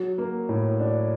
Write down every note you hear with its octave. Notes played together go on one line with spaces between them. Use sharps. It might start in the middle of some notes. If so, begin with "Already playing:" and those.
Already playing: F#3
A#3
A2
D4